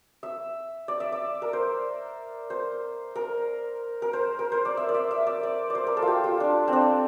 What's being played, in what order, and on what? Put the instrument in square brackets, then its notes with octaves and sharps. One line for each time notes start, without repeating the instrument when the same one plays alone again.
[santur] E5
D5
E5
D5
A#4
C5
C5
A#4
A#4
C5
A#4
C5
D5
E5
D5
E5
E5
D5
D5
C5 D5
A#4
A4
F4
G4
F4
D4
C4
D4